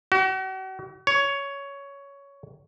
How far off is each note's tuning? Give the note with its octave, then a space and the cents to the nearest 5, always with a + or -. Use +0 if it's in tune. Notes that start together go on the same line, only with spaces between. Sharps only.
F#4 +40
C#5 +10